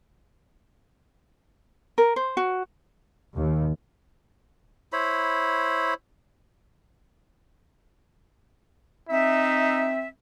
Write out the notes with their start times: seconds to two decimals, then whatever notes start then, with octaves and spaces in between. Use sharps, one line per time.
1.98 A#4
2.16 C5
2.37 F#4
3.37 D#2
4.92 E4 C5 C#5 B5
9.09 C4 D#4 E5